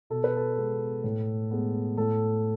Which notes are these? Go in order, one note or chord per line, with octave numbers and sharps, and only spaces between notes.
B2 A4
B4
A4
G#3 B3
A2
G#3 B3
A2 A4